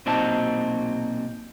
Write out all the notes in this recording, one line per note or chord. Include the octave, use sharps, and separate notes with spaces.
B1 A#2 C4 D#4 F#4 A5